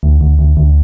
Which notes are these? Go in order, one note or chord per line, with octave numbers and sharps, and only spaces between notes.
D2
D2
D2
D2